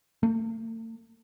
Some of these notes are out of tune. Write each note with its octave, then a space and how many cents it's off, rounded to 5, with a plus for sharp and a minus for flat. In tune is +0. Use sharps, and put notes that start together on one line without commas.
A3 +40